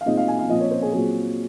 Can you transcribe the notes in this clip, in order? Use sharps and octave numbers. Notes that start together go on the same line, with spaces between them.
F5
A#2 G#3 C4 D#4 D#5
F5
G#5
F5
A#2 F3 C4 D#5
C#5
C5
G#4
A#2 F#3 C4 G#4